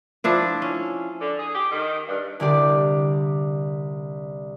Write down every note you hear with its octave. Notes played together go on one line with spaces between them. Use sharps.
F3 D4 E4
C#4
D3
G#4
G4
D#3
G2
C2 D3 D4 G4 D5